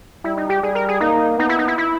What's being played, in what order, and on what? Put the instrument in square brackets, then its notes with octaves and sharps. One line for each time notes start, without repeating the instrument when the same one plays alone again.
[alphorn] G3 [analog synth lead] E4
[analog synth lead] D#4
G4
[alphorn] G3 [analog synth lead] G#4
[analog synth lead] A#4
G#4
[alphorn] A#3 [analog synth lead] D#4
[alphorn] B3 [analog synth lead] D#4
[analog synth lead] E4
D#4
E4
E4